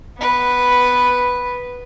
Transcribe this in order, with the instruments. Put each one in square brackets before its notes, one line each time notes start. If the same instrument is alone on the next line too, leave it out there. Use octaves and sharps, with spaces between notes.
[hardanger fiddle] B3 B4